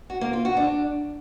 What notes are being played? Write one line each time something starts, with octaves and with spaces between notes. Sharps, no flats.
F#4
A#3
F4
F#4
D4